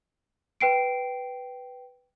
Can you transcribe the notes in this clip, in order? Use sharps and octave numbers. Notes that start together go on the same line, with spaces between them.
B4 G5 C7 D7